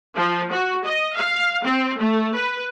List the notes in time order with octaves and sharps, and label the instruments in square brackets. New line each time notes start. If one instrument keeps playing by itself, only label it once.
[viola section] F3
F#4
D#5
F5
C4
A3
B4